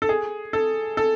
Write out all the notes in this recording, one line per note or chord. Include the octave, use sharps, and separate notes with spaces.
A4
G#4
A4
A4